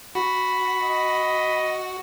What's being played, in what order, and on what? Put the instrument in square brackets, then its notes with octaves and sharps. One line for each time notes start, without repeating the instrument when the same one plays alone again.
[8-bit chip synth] F#4 [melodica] B5
[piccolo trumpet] D#5